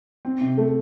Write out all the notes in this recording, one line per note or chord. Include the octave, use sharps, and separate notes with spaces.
C4
C3
A3